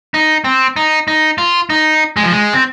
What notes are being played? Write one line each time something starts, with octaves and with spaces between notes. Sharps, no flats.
D#4
C4
D#4
D#4
F4
D#4
G#3
F3
G#3
C4